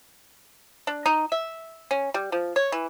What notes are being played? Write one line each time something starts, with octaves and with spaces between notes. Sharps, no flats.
D4
D#4
E5
C#4
G3
F3
C#5
E3